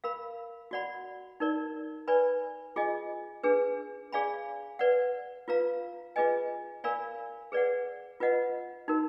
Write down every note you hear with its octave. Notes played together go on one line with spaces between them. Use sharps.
A#4 F5 B5
F#4 D5 F#5 B5
D#4 A#4 D5
B4 D5 G#5 B5
F4 G#4 D#5 G#5
D4 G#4 B4
G#4 D5 F5 G#5 B5
B4 D5 F#5
F4 B4 F5 A#5
F4 G#4 B4 D#5 G#5
A#4 D5 F5 G#5 B5
G#4 B4 D5 F#5
F4 B4 D#5 F#5
D#4 F#4 A#4